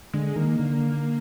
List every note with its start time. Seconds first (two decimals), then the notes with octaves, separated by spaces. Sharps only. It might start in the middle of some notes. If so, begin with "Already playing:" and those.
0.13 D3 G#3
0.36 D#3 A#3
0.59 D3